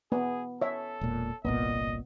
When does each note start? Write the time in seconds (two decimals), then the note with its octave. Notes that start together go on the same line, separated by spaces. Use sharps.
0.12 B3 G#4
0.61 A4 C#5 E5
1.01 E1 A#2
1.45 G1 C2 A#2 B3 D#5